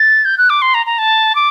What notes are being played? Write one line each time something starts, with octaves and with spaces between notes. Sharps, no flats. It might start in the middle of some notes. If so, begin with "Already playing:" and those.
Already playing: A6
G6
F#6
D6
C6
A#5
A#5
A5
D6